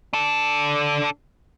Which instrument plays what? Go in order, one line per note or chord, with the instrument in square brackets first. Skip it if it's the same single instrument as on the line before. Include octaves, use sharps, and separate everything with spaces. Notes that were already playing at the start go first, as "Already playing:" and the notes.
[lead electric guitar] D4 A4